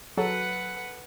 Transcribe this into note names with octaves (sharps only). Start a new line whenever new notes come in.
F#3 A4 B4 F#5